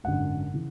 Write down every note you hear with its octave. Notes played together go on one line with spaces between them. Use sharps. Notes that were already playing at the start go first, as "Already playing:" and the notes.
G#1 F#2 D3 F#5
C#3 E3